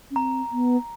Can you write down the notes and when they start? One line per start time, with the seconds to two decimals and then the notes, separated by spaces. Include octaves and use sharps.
0.11 C#4
0.16 C4 A#5
0.52 B3